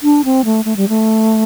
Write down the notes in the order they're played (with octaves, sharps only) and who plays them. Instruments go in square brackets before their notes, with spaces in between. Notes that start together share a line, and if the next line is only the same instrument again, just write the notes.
[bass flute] D4
C4
A3
A3
G3
A3